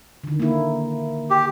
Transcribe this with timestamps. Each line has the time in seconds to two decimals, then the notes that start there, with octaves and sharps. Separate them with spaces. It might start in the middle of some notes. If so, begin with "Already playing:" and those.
0.24 D3 D#3
0.40 A#3 E4
1.30 G4